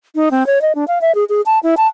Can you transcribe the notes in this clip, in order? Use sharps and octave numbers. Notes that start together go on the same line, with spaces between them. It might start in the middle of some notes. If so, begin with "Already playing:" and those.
D#4
C4
C#5
D#5
D4
F5
E5
G#4
G#4
A5
E4
A5